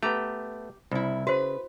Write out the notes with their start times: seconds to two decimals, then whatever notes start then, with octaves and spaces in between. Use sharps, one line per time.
0.03 A3 B3 G4 A#5
0.92 C2 C#3 E4
1.27 C#3 F#4 B4 C5